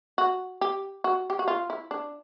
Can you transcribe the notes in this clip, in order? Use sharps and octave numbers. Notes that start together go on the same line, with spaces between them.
F#4
G4
F#4
G4
F#4
F4
E4
D4